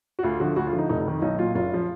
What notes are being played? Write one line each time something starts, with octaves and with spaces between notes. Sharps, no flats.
F#4
D2 F4
D3 F3 F#4
D2 F#4
F4
D3 F3
D#4
F1 D#4
D#4
F2 D#3
B1 D#4
A#2 F#3 F4
F#1 F4
F3